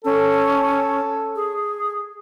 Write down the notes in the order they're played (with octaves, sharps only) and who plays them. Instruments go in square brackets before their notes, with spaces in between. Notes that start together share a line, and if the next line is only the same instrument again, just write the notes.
[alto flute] C#4 [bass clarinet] A4
[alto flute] G#4